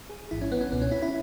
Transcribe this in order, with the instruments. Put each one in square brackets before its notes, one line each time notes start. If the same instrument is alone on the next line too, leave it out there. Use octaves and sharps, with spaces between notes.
[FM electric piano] G#4
A1 G#2 E3 E4
C#4
B3
C#4
C#2 B2 B3
C#4
E4
E4